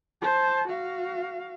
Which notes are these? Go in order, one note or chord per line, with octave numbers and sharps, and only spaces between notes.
C5 A5
F#4 F5